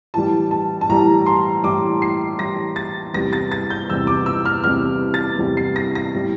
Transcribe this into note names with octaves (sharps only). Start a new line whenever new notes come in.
A2 E3 G3 A5
A5
A5
A2 E3 G3 A#5
C6
A2 E3 G3 D6
C7
A2 E3 G3 A#6
A6
E2 C3 G3 A#6
A6
A6
G6
E2 C3 G3 E6
D6
E6
F6
E2 C3 G3 F6
A6
E2 C3 G3
C7
A#6
A#6
A2 G3